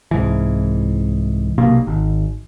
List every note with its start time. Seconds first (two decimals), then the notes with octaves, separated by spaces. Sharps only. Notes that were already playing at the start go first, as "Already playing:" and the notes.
0.11 C2 G#2 E3
1.58 B1 C3 A#3
1.87 G#1